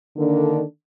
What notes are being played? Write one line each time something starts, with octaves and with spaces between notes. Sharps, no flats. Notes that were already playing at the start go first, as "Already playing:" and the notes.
D3 D#3 A#3 D4 A4